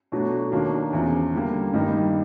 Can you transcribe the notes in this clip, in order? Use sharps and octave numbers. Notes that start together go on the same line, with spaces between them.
B2 F#3 A3 D4 F#4
D#2 D#3 F#3 A#3 D4
E2 C#3 F3
D3 G3 A#3
G2 D#3 G3 A#3 D#4